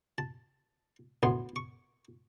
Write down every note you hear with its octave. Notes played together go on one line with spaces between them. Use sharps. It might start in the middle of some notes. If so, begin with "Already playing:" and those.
A5
D2 A2 B3 C6
C#6